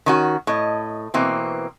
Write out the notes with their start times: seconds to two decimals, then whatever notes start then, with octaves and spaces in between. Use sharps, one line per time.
0.06 D#3 C#4 F#4
0.47 A2 D#5
1.14 B2 E3 A#3 C4